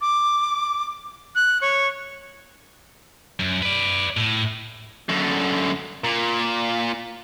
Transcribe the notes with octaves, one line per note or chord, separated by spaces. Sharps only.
D6
F#6
C#5
F#2
B4 D5
A2
F#2 D3
A#2